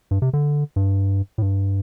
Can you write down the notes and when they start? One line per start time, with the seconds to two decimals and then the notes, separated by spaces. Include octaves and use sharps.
0.11 G2
0.22 C3
0.33 D3
0.76 G2
1.38 A2
1.42 G2